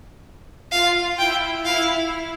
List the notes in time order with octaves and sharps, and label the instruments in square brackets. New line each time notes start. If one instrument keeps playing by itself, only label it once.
[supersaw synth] F4 [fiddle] F5
[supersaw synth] E4 [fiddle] G5
[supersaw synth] E4 [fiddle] F5